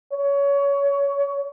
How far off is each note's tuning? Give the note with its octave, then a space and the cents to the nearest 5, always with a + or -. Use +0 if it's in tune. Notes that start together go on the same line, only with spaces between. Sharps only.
C#5 +20